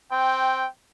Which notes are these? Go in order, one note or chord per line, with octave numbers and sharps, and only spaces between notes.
C4 G5